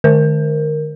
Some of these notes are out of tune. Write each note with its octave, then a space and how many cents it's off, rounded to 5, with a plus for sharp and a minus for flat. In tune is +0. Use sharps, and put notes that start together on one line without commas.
D#3 -45 A#4 +0